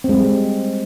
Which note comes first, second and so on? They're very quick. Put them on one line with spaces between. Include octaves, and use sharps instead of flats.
C4 G#3 G3